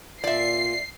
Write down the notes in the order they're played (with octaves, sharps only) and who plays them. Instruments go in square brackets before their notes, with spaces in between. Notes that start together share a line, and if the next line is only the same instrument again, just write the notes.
[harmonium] A#2 F4 [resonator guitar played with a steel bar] D5 E5 [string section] C7